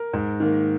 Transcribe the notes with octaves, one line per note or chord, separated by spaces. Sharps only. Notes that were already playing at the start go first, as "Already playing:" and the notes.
Already playing: A#4
G#2
D#3 A#3